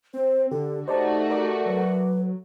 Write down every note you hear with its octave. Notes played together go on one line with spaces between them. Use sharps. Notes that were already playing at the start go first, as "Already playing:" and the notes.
C4 C5
D3 G4 A4
A3 D#4 F#4 G4 C5 D5 A5
A#4 D5 D6
F#3 B4